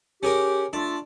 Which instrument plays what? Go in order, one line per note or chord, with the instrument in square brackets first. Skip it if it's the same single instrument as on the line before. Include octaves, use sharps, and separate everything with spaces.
[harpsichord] C#4 G#4 A#4 [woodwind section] G4
[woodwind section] A3 F4 A4 [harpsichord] D4